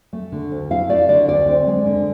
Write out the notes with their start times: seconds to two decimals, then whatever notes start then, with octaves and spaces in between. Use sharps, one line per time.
0.13 A3
0.32 D3
0.52 D2
0.71 E4 F5
0.89 A3 D5
1.08 D3 D5
1.28 D2 D5
1.47 C4
1.67 G#3
1.86 D3